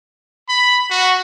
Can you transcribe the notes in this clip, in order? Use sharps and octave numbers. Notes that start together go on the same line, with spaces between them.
B5
F#4